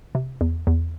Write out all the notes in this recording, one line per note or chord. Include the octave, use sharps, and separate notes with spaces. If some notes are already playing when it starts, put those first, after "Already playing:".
C3
E2
E2